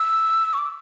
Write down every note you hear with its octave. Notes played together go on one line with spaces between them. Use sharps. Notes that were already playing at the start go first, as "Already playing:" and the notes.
Already playing: E6
C#6
D6